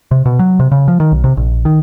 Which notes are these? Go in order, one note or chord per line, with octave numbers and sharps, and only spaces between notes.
C3
B2
F#3
C3
C#3
F3
D#3
B1
C3
A#1
D#3